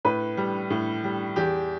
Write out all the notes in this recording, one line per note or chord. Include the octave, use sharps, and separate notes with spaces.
A2 B4
G3
A2
G3
E2 G4